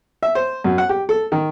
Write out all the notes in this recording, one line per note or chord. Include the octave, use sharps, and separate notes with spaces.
E5
C5
F#2
F#5
G4
A4
D#3